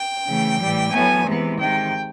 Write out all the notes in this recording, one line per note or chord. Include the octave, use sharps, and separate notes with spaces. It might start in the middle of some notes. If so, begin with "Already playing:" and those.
Already playing: G5
C#3 E3 A3
A2 E3 G3
A2 F#3 B3 G#5
C3 E3 G#3 B3
C3 D#3 G#3 G5